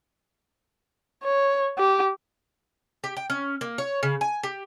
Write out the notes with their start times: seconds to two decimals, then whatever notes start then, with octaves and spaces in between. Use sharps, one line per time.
1.23 C#5
1.78 G4
3.04 G4
3.17 G5
3.30 C#4
3.61 A#3
3.78 C#5
4.03 C#3
4.21 G#5
4.43 G4